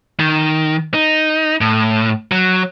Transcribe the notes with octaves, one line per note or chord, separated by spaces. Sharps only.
D#3
D#4
A2
F#3